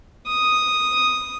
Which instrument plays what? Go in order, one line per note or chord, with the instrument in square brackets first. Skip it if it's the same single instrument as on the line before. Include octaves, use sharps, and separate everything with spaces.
[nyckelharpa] D#6